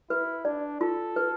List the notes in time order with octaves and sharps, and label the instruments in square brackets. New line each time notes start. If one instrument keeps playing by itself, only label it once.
[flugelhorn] E4 [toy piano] B4
[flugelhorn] D4 [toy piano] D5
[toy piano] F4 [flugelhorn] A4
[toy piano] B4